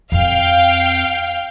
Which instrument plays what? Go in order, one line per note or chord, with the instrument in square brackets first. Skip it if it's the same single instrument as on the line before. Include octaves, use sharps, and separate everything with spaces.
[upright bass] F2 C4 [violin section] F5 G5